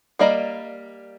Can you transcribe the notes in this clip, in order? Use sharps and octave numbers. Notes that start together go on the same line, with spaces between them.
G3 A#3 D5 D#5 A#5